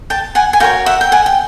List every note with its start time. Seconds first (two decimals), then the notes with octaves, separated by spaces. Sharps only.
0.10 G5 A5
0.35 F#5 G#5
0.53 G#5
0.60 F#4 A#4 C#5 F5 G5
0.86 E5 F#5
1.01 G5
1.12 F#5 G#5
1.26 G5